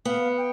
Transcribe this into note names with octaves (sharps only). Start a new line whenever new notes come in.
B3 F5
G5